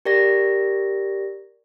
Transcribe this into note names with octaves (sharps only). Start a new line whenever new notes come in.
G4 A#4 D5 A#6